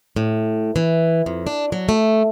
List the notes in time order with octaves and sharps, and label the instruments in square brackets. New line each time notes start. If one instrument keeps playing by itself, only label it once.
[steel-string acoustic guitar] A2
E3
F2
D4
F#3
A3